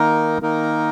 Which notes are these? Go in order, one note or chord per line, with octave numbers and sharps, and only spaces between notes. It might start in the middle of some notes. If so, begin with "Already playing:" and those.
Already playing: D#3 A#3 D#4 A#4
D#3 A#3 D#4 A#4